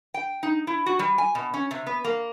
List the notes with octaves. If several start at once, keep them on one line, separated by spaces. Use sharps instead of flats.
G5
D#4
E4
F#4
G3
G#5
B2
C#4
C3
B3
A#3